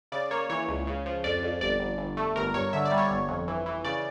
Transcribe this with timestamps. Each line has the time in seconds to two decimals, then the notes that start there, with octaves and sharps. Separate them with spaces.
0.12 C#3 D5
0.31 A#3 C#5
0.50 E3 C#5
0.68 C#2
0.87 C#3
1.06 F3
1.24 F2 D5
1.43 F2
1.61 G1 D5
1.80 G1
1.98 G1
2.17 A3
2.36 G1 A#4
2.54 G2 C#5
2.73 D3 E5
2.85 D5
2.91 G3
2.98 C#5
3.10 G1
3.29 F2
3.48 E3
3.66 E3
3.84 C#3 D5